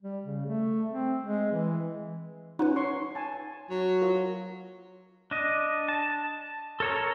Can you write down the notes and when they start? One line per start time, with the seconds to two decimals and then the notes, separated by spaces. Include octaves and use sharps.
0.02 G3
0.24 C#3
0.46 A3
0.89 C4
1.23 G#3
1.52 E3
2.59 C#4 D#4 F4 B4 F#5
2.76 C#5 C6 C#6
3.15 G#5 A5
3.70 F#3
4.02 F4 A#4
5.31 D4 D#5
5.88 A5
6.80 A4 A#4 C#5 A5 A#5